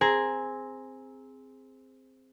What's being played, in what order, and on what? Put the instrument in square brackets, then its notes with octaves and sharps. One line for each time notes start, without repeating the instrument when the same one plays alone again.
[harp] C4 G#4 A#5